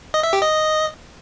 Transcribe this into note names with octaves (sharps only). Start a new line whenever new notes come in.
D#5
E5
G4
D#5